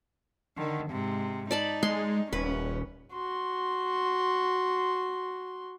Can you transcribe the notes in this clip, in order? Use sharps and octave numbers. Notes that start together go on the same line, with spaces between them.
D3 D#3
G#2 C3
D#4 D5 A5 B5
G#3 C6
D#1 C#4 B4
F#4 C6